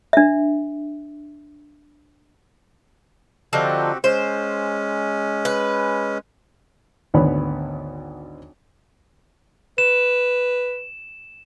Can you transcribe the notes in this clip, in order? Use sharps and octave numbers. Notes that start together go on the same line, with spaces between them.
D4 E5
D3 F3 C4 D#4 F#4 G4
G#3 C#4 C5
B4
G#1 D2 B3 C#5 B5
B4 E7